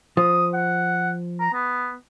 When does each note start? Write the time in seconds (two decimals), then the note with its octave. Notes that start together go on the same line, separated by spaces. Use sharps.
0.17 F3 D#6
0.54 F#5
1.40 A#5
1.54 B3